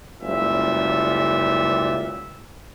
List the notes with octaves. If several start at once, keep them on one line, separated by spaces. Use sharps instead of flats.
F#1 C#2 A#2 G3 E5